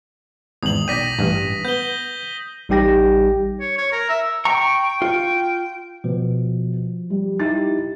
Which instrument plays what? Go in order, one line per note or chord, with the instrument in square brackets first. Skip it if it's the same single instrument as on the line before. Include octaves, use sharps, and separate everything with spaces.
[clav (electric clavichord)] G#1 E2 [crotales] D#6 F#7
[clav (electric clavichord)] B1 D5 G5 [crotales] A#6 B6 D#7
[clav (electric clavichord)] A1 G2
[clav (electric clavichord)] B3 [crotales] G6 G7
[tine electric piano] A1 G3 D#4 G4 G5 A#6
[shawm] C#5
C#5
A#4
E5
[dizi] G5 [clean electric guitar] A#5 [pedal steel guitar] C#6
[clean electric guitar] F4
[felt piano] B2 [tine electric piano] F3
[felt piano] G3
[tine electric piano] D#4 E4 G4 [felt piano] A6